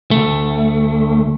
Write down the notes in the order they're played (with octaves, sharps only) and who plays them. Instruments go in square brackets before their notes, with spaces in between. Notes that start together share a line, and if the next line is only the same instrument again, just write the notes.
[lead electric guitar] D2 A3